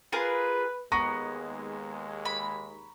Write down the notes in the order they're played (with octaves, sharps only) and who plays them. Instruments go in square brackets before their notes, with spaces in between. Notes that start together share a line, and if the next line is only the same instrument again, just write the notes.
[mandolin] F4 G#4 A#4 [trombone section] B4
[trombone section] D#2 G#3 [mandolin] B3 [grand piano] A#5 C#6 A#6
[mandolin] B5